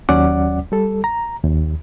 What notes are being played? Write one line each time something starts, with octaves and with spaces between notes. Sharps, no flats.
D#2 F#3 C#4 D5 F#5 D6
G3 A4
A#5
D#2